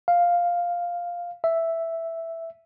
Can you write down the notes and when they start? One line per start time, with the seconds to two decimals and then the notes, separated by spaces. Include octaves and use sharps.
0.08 F5
1.44 E5